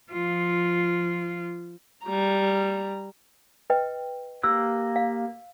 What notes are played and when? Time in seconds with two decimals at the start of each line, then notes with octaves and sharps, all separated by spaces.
0.12 F3 F4
2.05 G3 A#5
3.70 B4 D#5 G5
4.43 A#3 G4 E6 F#6
4.96 F5